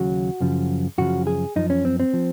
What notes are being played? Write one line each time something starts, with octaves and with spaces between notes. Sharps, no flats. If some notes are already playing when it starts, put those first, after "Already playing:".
Already playing: D#2 C#3 F#3 F#4
F#2 C#3 F3
F#2 C#3 F3 F#4
G#4
F#2 F3 D#4
C#4
C4
C4
F3